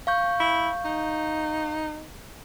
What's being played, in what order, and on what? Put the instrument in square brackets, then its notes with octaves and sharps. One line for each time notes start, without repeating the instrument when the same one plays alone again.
[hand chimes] F5 C#6 G6
[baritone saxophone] E4
D#4